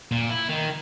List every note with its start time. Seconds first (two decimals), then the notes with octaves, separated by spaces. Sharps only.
0.12 A#2
0.30 E4
0.49 D#3